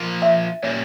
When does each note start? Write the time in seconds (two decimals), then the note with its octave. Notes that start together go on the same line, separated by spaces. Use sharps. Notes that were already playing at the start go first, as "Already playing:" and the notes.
Already playing: F3 A#3 F4 A#4
0.22 E5
0.63 A#2 G3 A#3 C#4 C#5